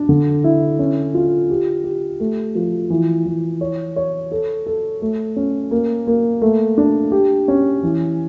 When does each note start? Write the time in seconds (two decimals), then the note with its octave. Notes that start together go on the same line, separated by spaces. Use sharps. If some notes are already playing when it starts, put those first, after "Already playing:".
Already playing: D4
0.09 D3
0.44 E4
0.79 C#4
1.14 F4
1.50 G4
1.84 G4
2.20 A3
2.55 F3
2.90 E3
3.26 E3
3.61 C#5
3.96 C#5
4.32 A4
4.66 A4
5.02 A3
5.36 C#4
5.71 A#3
6.07 A#3
6.42 A3
6.78 D4
7.12 G4
7.48 C#4
7.83 E3